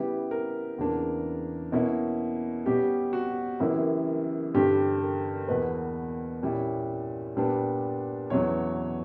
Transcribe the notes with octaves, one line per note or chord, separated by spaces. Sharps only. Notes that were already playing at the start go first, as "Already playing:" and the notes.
Already playing: C#3 G3 B3 E4 G4
A#4
E2 C#3 E3 A#3 D4
B2 A#3 C#4 E4
B2 G3 C#4 G4
F#4
F#2 C#3 E3 G3 A#3 E4
G2 D3 G3 G4
A#4
E2 B2 A#3 B4
A#2 G3 C#4 E4
A#2 G3 B3 D4
E2 B2 F#3 C#4 E4 C#5